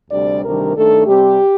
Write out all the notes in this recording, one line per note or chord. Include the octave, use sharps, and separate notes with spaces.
D2 C3 G3 D4 D5
D2 C3 D#3 G3 D4 A#4
G2 D#3 A3 D4 A4
C3 G3 C4 G4